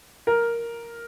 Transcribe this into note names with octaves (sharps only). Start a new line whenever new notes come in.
A#4